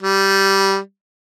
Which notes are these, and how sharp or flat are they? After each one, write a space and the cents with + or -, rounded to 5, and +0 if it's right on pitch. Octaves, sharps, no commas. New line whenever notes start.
G3 -10